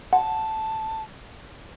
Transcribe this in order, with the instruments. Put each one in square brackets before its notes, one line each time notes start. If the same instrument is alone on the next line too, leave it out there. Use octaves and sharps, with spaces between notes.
[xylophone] F#5 [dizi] A5